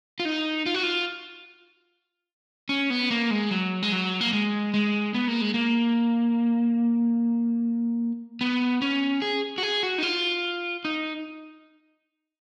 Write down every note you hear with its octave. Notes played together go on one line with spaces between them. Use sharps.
F4
D#4
F4
F#4
F4
C#4
B3
A#3
G#3
F#3
G#3
F#3
A#3
G#3
G#3
B3
A#3
G#3
A#3
B3
C#4
G#4
F#4
G#4
F#4
D#4
F4
D#4